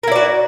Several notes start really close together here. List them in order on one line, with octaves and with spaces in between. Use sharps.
A#4 E4 D5 F#4